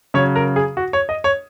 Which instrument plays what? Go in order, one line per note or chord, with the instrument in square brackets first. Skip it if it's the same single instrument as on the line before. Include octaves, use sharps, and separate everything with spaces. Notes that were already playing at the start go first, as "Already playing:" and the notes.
[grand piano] C#3 F#3 C#5
A#4
G#4
F#4
C#5
D#5
C#5